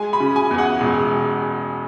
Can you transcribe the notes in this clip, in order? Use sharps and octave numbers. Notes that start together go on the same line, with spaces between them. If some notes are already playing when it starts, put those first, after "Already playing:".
Already playing: G#3 G#5
B5
C#3
G#5
E2
F#5
E1